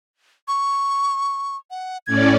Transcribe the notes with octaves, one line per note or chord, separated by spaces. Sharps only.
C#6
F#5
A2 C#4 D5 G#6